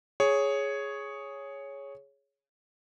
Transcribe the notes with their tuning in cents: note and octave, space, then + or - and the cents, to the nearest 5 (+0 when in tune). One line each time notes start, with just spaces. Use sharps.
G#4 +0 C#5 +0